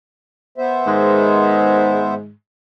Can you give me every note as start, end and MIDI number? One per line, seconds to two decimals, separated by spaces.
0.58 2.14 59
0.58 2.14 72
0.58 2.14 76
0.87 2.31 44
0.87 2.31 51
0.87 2.31 56